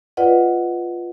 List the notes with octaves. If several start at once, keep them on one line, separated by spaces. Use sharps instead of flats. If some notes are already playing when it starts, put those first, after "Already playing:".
F4 B4 D5 D#5 F#5